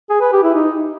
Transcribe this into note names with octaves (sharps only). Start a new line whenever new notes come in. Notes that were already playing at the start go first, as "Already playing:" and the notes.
G#4
B4
G4
E4
D#4